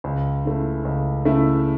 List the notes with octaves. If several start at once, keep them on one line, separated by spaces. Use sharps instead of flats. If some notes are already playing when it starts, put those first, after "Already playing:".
C#2
C#3 A3 E4
C#2
C#3 A3 E4